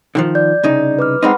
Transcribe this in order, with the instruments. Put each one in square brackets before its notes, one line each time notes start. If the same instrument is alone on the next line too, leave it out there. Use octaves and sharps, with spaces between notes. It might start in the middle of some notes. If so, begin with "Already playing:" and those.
[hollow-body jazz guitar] D3 D#3 F3
[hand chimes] D5 G6
[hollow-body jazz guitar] C2 C#3 D#4
[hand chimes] B4 D6 F6
[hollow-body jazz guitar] G#3 C4 D#4 [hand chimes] F#5 B5 C6